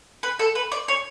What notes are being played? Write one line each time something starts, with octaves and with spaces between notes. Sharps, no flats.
B4
A4
B4
D5
C#5